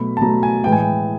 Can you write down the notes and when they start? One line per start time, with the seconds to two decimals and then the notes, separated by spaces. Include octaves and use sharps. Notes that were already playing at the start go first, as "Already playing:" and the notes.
Already playing: B2 F#3 A3 B5
0.17 A5
0.22 B2 F#3 A3 A#5
0.43 G#5
0.64 A2 E3 G#3 G5
0.72 G#5
0.80 G5